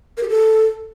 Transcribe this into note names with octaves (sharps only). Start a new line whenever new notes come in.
A#4
G4
A4